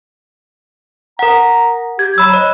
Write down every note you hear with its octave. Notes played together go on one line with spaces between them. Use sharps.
A#4 F#5 A#5
G4 G#6
F#3 B5 E6
C#5 D#5